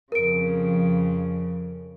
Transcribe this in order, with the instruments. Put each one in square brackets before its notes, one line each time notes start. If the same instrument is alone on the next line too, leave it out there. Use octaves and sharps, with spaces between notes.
[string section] F2 C#3 [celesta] A#4 D7